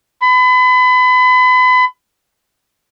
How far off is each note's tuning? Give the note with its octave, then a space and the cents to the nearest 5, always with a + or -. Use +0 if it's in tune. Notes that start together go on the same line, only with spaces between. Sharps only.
B5 +35